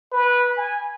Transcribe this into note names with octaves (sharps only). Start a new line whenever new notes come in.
B4
G#5